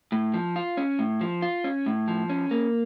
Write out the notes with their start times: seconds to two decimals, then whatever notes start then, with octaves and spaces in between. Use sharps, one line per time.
0.12 A2
0.34 F3
0.56 F4
0.77 C#4
0.99 A2
1.21 F3
1.42 F4
1.64 C#4
1.86 A2
2.08 F3
2.30 C#4
2.51 A#3